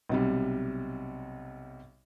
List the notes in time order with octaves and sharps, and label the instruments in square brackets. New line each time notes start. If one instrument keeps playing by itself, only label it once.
[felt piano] B1 C3 G3